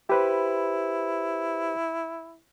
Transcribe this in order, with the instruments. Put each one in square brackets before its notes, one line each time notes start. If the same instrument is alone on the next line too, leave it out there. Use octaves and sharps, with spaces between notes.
[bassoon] E4 [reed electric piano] G4 B4 C5